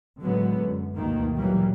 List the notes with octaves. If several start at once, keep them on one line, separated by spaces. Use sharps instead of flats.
A2 D3 F#3 G#3 B3
F#2
G1 D2 B2 D#3 A#3
A#2 E3 F#3 G3 A#3